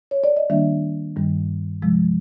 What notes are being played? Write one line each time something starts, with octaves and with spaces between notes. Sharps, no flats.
C#5
D5
D#5
D#3 G3 A#3 D4 E5
G2 D#3 G3
C3 F3 G#3